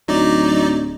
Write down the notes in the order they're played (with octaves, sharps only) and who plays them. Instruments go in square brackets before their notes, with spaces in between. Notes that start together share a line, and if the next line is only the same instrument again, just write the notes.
[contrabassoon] D1 [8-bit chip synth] F#3 D#4 D5